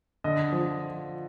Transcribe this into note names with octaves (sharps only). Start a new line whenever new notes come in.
D3 D#5
F3